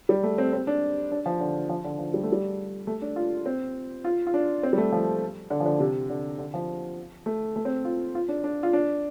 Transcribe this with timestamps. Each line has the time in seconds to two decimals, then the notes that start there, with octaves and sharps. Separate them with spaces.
0.09 G3
0.24 A3
0.38 C4
0.53 C4
0.67 D4
1.12 D4
1.26 F3
1.40 D3
1.69 F3
1.84 D3
1.99 F3
2.14 G3
2.23 A3
2.32 G3
2.87 A3
3.02 D4
3.16 F4
3.46 C4
4.04 F4
4.27 F4
4.34 D4
4.63 C4
4.73 G3
4.78 A3
4.92 F3
5.50 D3
5.60 F3
5.65 D3
5.80 C3
6.10 D3
6.38 D3
6.54 F3
7.26 A3
7.56 A3
7.65 C4
7.85 F4
8.15 F4
8.29 D4
8.44 D4
8.63 F4
8.73 D4